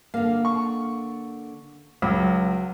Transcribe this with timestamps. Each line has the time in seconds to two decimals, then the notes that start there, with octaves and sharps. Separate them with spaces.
0.14 D3 A#3 F5
0.45 C#6
2.02 C#2 F#3